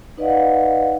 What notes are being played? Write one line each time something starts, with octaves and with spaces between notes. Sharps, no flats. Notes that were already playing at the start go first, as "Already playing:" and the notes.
D#4 B4 D5 D#5 F5 F#5